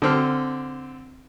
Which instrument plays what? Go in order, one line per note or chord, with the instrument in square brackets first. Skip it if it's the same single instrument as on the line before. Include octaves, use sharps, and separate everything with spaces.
[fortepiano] D3 C4 F6